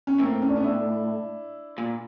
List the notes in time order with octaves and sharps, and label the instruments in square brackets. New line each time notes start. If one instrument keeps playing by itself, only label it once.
[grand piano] C#4
[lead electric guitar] A2 [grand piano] A#3 C4
[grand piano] C#4
D4
B3 C#4
D4 E4
[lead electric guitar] A#2